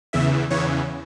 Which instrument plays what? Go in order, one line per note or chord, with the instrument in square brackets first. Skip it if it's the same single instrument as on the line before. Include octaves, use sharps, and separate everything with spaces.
[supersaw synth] E2 C#3 E3 E5
E2 C#3 E3 C#5